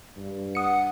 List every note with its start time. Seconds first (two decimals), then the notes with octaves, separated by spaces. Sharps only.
0.17 G2
0.55 F#5 D#6 C#7